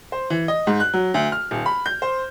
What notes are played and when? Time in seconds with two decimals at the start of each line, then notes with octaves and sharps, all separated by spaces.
0.12 C5
0.30 E3
0.48 D#5
0.67 G#2
0.80 F#6
0.94 F#3
1.14 D2
1.32 F6
1.51 D#1
1.66 B5
1.86 G6
2.02 C5